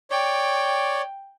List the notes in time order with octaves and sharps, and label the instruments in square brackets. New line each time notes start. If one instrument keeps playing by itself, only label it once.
[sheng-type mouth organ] C#5 D5 [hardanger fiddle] G5